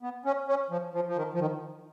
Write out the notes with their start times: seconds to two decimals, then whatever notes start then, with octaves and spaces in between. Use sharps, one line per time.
0.03 B3
0.25 C#4
0.48 C#4
0.70 F3
0.94 F3
1.07 F3
1.16 D#3
1.34 F3
1.40 D#3